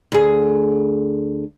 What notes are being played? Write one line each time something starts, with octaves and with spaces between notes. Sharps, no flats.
D2 G#4